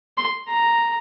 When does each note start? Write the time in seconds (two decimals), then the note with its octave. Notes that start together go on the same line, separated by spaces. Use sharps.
0.18 C6
0.48 A#5